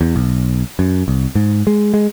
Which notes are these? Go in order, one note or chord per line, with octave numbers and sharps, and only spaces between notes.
E2
B1
F#2
C2
G#2
G#3
G#3